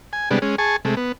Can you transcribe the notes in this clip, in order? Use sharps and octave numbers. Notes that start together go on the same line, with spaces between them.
G#5
C3 G3 G#3 B3 D4
G#3 C#4
G#4 G#5 A5 C#6
C3 G#3 A3
B3